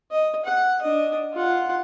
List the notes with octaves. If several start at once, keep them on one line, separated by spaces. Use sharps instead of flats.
D#5
F#5
D4 D#5
F4 F#5